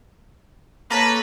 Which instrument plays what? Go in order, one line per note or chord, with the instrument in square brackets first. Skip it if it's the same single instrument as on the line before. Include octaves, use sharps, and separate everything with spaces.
[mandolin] A#3 A4 C#5 [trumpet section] B4